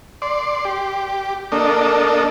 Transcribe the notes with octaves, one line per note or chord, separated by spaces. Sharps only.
D5 C6
G4
A#3 D4 A4 D#5